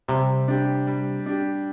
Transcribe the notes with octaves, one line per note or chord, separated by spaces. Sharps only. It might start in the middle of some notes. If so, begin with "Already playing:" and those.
C3 G3
D4 G4
G3
D4 G4